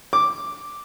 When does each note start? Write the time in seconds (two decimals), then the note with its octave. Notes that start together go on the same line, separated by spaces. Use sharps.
0.13 D6